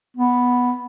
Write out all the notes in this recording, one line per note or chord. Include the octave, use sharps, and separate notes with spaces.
B3